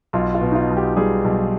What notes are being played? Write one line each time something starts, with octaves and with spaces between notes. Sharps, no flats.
B1 F4
F4
B2
D#4
F4
B1
G4
G3 G#4
B1